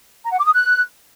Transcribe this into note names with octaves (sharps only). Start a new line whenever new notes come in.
A#5
F#5
D6
D#6
F#6